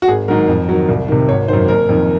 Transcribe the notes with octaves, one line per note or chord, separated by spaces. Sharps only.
F#4
G#1 G#4
G#2 D#3 F#3 A#4
F2
D#3 F#3
C2
C3 D#3
G#1 C#5
F#2 D#3 C5
F#1 A#4
F2 D#3